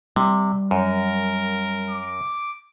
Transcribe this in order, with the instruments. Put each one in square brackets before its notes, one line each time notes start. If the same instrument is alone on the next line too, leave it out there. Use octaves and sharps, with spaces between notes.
[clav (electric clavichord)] C3 [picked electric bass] G3
[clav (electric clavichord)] F#2 [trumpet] A#4
[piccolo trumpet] D6